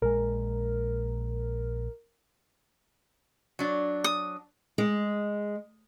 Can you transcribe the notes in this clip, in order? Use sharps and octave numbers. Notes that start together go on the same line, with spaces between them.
A#1 G#3 A#4
F#3 D4
D#6
G#3